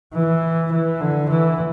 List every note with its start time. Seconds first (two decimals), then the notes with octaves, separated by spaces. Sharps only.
0.13 E3
0.72 E3
1.00 D3
1.29 E3